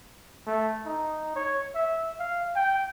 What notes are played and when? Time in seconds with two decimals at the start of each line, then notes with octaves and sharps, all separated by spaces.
0.47 A3
0.85 D#4
1.36 C#5
1.75 E5
2.19 F5
2.55 G5